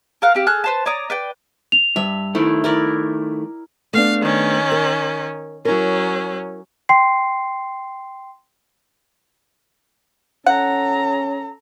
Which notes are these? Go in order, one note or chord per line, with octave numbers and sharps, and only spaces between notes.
A#4 F5 F#5
C4 G4 F5
G#4 A4 F6 F#6
B4 C5 A5
C#5 D5 A#5 D#6
B4 D5 G5
F7
G2 E5
D#3 A3 E4
E4 A#4 D5
A3 B3 D4 F5
D#3 C#4
A#4
F#3 C#4 E4 A#4
G5 C6 C7
C#4 A4 F#5 A#5